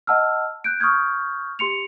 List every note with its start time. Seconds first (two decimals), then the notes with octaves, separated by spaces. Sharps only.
0.07 D#5 F#5 A5 E6 F6
0.64 F#6 G6 D7
0.80 C#6 D#6 F6 G6 G#6
1.59 G4 C6 C#7 F7